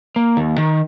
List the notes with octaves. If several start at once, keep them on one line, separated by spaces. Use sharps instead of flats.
A#3
D#2
D#3